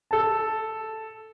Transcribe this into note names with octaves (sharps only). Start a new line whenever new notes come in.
A4 A5